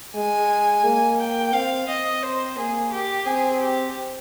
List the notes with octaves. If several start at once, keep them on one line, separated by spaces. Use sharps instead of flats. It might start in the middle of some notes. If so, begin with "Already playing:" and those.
G#3 G#5
A#3
G5
C4 F5
C4 D#5
C5
A#3 G#4
G4
C4 G#4
G4